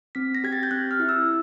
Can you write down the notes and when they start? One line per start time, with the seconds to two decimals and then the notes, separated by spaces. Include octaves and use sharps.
0.15 C4 B6
0.35 A#6
0.44 G4 G#6
0.53 A6
0.63 G6
0.71 C4 F#6
0.91 F6
1.00 E4
1.09 E6